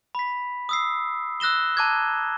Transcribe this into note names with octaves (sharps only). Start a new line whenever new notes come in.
B5 B6
D#6 E6 C7
E6 F#6 A#6 E7 G7
A5 A#5 D6 F#6 G#6